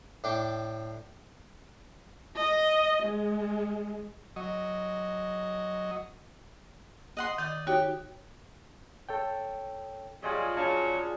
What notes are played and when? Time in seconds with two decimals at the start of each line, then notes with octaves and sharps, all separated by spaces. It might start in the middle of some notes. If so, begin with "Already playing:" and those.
0.24 A2 D4 G5 D6
2.36 D#5
3.03 G#3
4.36 F#3 D#5
7.17 D#5 F#5 C6
7.38 D#3 D5 D#5
7.67 D#4 F#4 G4 C#5
9.09 A4 C#5 G5
10.23 F#3 G3 F4 G#4 D#5
10.57 C#3 F3 F#3 D4 F5 A5